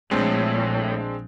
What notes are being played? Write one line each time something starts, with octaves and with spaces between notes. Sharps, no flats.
A#1 A2 F3 G#3 C4 D4